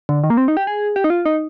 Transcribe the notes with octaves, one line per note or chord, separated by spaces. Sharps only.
D3
D#3
A#3
C4
D#4
G4
G#4
G4
D#4
F4
D#4